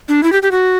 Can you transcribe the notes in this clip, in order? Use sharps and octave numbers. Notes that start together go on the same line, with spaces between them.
D4
E4
G4
G4
F#4